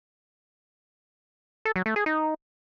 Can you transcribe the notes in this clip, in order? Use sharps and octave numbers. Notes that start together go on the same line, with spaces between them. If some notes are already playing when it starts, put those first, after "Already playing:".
A4
F#3
A3
G#4
D#4